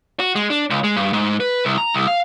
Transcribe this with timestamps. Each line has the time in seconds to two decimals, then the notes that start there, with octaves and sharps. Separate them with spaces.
0.20 F#4
0.35 G#3
0.50 D4
0.70 C#2
0.84 G#3
0.97 G2
1.13 G#2
1.40 B4
1.65 C2
1.78 A#5
1.94 C2
2.08 F5